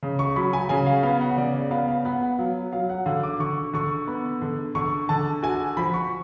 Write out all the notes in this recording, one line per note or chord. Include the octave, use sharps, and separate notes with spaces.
C#3
C#6
F#3 B5
G#5
C#3 G#5
F5
B3 F5
F#5
C#3 D5
D5
B3 F5
F5
B3 F#5
F#5
F#3 F5
F#3 F5
F#5
D3 F5
D6
D3 C#6
D3 C#6
B3
D3
D3 C#6
D3 A5
F#4 G#5
F3 B5
C#6